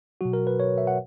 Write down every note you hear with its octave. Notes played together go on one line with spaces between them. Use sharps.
B2 F#3 F#4
A#4
B4
C#5
E5
F#5